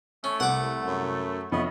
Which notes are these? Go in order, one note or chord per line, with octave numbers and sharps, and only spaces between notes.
A3 C#4
C2 F#5 D6
F#2
F2 B3 C#5 D#5 E5